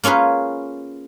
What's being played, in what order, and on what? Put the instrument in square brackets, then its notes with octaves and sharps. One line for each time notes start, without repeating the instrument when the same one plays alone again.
[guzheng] A#3 C#4 F4 G#4 B4